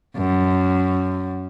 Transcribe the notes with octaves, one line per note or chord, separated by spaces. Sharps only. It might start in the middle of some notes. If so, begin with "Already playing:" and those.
F#2